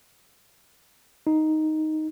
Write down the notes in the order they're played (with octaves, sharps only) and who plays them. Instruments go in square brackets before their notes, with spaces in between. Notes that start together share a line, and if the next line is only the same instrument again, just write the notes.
[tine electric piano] D#4